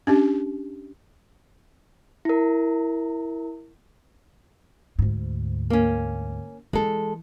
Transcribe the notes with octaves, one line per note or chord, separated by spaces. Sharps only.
C#4 D4 G4
E4 A#4
D2 G#2
A#3 C#4
E3 G#3 A4